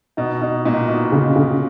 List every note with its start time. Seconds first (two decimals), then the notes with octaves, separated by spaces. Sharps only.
0.17 B2 D#4
0.41 B2 D#4
0.65 A#2 D#4
0.88 B2 D#4
1.12 C#3
1.36 C#3